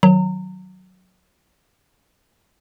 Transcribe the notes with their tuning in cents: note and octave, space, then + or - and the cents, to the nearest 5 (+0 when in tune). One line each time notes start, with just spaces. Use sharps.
D#3 +0 F#3 +0 A#5 -30